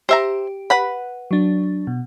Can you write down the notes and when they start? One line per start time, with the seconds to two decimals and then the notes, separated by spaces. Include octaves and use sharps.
0.09 G4 C5 E5 A#5
0.70 B4 F#5 B5
1.31 F#3 D4
1.87 B2